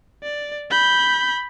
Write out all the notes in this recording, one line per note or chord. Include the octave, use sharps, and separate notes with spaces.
D5
B5 G6